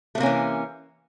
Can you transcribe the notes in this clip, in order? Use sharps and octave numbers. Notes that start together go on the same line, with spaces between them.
C3 E3 A3 A#3 C#4